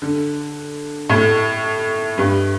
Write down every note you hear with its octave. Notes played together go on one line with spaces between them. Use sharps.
D3
A2
G2